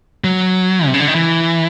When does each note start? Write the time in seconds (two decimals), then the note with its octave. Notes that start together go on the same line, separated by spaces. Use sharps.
0.24 F#3
0.86 C3
0.94 C#3
1.00 D3
1.08 D#3
1.15 E3